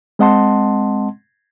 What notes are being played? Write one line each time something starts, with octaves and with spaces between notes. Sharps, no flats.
G#3 C4 D#5 F#5 A5 C6